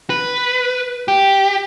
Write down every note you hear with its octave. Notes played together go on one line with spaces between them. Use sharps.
B4
G4